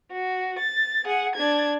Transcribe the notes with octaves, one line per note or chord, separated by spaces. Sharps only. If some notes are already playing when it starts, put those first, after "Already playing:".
F#4
A6
G#4 F#5
D4 G#6